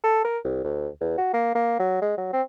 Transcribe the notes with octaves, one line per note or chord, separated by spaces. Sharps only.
A4
A#4
C2
D2
E2
F#4
A#3
A#3
F#3
G#3
F#3
C4